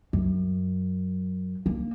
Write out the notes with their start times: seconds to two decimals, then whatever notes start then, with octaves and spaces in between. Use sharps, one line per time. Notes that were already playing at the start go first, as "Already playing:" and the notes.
0.13 F#2
1.66 A#3